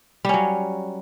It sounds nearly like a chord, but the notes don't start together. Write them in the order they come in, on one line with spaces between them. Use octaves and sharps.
G3 C#4 F#3